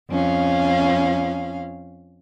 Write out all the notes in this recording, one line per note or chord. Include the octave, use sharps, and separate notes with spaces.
F2 C#4 F5